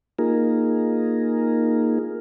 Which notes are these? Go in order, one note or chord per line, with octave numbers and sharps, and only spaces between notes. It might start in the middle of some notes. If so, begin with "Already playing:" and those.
A#3 D#4 F4 G#4 A#4